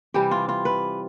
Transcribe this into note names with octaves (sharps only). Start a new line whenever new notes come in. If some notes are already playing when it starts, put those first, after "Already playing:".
C3 E3 G3 G4
F4
F4
B4